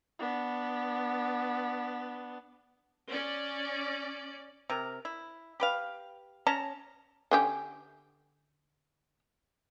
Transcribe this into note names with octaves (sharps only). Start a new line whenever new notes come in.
B3 D4
C#4 D5
C3 A#4
E4
G4 B4 F5
C#4 A5 A#5
D3 C#4 G4